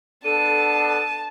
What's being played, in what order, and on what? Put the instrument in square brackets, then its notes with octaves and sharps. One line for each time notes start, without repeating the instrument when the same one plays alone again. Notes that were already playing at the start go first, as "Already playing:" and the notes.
[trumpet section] B3 D4 [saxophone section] A4 [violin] A5 [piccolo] D#7